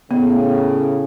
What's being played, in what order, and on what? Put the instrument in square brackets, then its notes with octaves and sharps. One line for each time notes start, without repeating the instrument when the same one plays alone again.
[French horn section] A2 C#3 [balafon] B3